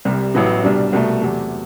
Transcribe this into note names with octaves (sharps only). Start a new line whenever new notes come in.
C2 C3 G3
A1 A2 F#3 B3 E4
C2 B2 G3 D4
C2 B2 A3
E2 C3 F#3 A3